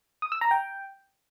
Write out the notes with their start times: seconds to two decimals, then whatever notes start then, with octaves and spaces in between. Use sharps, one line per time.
0.22 D#6
0.32 E6
0.41 A#5
0.51 G5